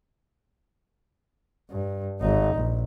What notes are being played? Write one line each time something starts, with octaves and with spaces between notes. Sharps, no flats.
G2
G#1 D#4
A#1